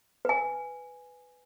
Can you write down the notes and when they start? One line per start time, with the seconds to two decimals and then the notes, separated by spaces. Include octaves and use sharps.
0.25 B4 G#5